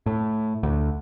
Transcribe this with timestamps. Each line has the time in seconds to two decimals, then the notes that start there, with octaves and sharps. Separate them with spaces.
0.06 A2
0.63 D2